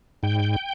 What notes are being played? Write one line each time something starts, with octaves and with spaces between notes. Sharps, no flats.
G#2 G5